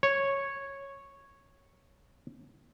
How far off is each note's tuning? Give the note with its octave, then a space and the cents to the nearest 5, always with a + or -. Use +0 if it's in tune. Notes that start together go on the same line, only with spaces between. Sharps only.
C#5 -5